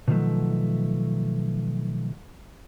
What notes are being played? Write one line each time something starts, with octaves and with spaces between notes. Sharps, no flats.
B2 D#3 F3 F#3 A3